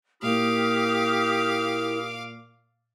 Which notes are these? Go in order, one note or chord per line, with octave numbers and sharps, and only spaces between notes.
A#2 E4 G4 A#4 F5 D6 D#6 F6